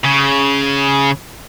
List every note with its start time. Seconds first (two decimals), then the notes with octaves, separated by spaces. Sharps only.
0.05 C#3